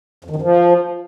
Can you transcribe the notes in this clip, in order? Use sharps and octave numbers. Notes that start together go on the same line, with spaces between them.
F2
D#3
F#2
F3